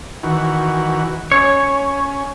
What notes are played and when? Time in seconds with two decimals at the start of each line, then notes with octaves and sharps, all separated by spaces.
0.23 D#3 E3 F#4
1.32 C#4 C#5